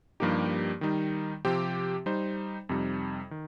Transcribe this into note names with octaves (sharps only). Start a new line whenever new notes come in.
G2 F3 A#3 D#4 G4
D#3 G3 D#4
C3 F3 C4 G4 C5
G3 D#4 C5
F2 C3 G3 D#4
D#3